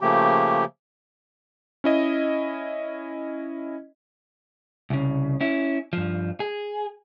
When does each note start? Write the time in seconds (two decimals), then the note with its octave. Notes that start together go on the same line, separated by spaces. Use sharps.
0.01 C#3 F3 A3 A#3 G4
1.84 C#4 E4 D#5
4.90 C2 C#3
5.41 C#4 E4
5.93 G2 F3
6.40 G#4